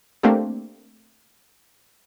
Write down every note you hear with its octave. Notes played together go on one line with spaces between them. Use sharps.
A3 A#3 C4 D4 G4